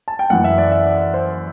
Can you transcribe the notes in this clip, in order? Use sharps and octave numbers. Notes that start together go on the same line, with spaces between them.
A5
G5
F#2 E3 F#5
E5
D5
E5
D5
C5